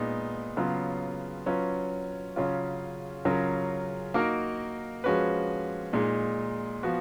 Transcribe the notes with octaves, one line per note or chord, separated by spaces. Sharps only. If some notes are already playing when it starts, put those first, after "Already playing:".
Already playing: A#2 G#3 B3 D#4
C#3 F#3 B3 F4
F#3 C#4 F4 B4
C#3 F#3 C#4 F4
C#3 F#3 C#4 F4 A#4
A#3 D#4 F#4 A#4
F3 G#3 C#4 F#4 B4
A#2 G#3 D#4
F3 B3 F#4